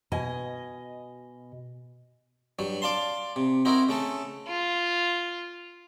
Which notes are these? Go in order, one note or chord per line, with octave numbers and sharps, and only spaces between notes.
B2 D#5 G#5
G2 F#3
D5 F5 A5 C6
C3
C4 D#4 E4 F#4 A#4
C#3 A3 A4
F4